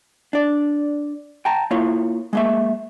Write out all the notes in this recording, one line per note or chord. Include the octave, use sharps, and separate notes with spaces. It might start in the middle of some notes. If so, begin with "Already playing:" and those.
D4 D5
G5 A5 A#5
A#3 E4 F4 C#5
G#3 A#3 E5